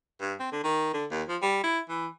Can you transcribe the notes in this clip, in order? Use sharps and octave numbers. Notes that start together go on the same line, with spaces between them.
G2
C4
D3
D#3
D3
D#2
F3
G3
E4
E3